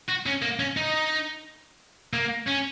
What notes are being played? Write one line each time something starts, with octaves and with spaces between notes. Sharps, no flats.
F#4
C#4
A#3
C#4
D#4
A#3
C#4